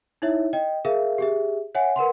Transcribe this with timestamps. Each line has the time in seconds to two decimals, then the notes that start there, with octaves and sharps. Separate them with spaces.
0.22 D#4 E4 C#5 E5
0.53 D#5 G5
0.85 G#4 A#4 E5 F5
1.18 G4 G#4 E5
1.75 C#5 E5 F#5 G#5
1.96 A#4 B4 F#5 C6